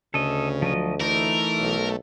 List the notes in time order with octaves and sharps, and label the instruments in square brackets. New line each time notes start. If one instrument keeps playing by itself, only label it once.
[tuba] D2 [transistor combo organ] C#3 [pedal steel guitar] A4 D#5
[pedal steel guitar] F3 F#3 D#5
[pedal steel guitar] E3 D#4 [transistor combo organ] A3 [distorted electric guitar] A#4
[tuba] B1